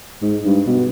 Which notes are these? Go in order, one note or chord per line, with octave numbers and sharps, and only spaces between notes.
G#2
G2
B2